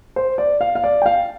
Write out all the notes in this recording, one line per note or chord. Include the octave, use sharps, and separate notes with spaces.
C5
D5
F5
F5
D5
G5
F5